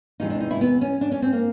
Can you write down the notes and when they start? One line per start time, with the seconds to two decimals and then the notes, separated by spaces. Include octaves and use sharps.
0.20 E2 C3 E3 G#3 D#4
0.30 D4
0.41 D#4
0.51 E4
0.61 B3
0.81 C#4
1.01 D4
1.12 C#4
1.22 C4
1.33 A#3